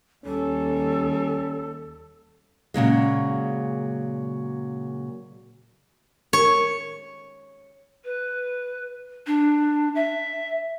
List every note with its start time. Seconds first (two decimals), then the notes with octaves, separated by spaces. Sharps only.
0.25 D#2 G3 C#4 A4
2.74 A#2 C#3 F#3 G#3
6.33 C#5
8.04 B4
9.27 D4
9.95 E5